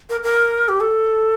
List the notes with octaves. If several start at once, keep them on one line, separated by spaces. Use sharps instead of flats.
A#4
A#4
G4
A4